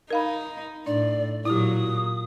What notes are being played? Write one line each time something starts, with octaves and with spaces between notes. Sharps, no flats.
D#4 A#4 F5 B5
A2 D4 D5
A#2 F#3 E4 G4 D#6